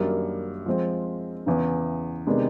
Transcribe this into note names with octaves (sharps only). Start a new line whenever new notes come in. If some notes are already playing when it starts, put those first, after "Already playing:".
Already playing: F#2 D#3 G3 A#3 D4
F3 G#3 C4
E2 C#3 E3
C3 D#3 G#3 B3 D4